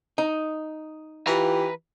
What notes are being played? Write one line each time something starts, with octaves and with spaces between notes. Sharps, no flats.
D#4
E3 F4 G4 B4 A#5